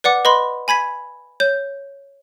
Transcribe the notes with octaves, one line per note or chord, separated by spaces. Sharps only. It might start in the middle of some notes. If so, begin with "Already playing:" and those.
B4 D5 F#5 D6
B4 D#5 B5 C6
G#5 B5 G#6 B6
C#5 G6